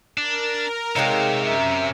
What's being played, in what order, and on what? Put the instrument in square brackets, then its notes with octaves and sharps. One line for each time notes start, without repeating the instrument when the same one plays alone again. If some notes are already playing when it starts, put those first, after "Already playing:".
[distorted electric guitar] D4 [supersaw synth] A#4
[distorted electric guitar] C3 [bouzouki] G#3 A3 D#4 [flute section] C#5 F5 G5
[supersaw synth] F#2 C#4 [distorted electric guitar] C3 [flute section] A#4 E5